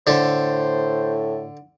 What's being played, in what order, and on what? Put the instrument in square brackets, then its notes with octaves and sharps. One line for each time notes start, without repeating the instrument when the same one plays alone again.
[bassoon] A2 [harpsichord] D3 A4 [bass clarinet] C5